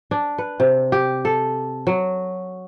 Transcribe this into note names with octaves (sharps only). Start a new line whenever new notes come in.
D4
B4
C3
G4
A4
F#3